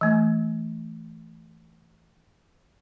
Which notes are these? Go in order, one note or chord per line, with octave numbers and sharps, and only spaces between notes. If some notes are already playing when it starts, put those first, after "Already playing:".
E3 A3